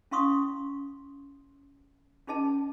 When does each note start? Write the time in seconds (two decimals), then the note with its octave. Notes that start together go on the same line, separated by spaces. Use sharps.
0.11 C#4 E4 F5 C6 C#6 D#6
2.27 C#4 D#4 G#4 D#5 A5